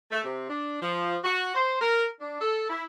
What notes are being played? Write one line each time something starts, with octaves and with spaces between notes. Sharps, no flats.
A3
C3
D4
F3
F#4
C5
A#4
D4
A4
E4